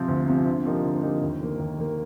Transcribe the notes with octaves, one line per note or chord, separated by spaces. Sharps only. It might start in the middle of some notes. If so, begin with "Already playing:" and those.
Already playing: C3 F3 C4
D2
C3 F3 C4
D3
F3 A#3 D#4 G4
D3
F3 A#3 D#4 G4
D#2
D#3 A#3
D#2
D#3 A#3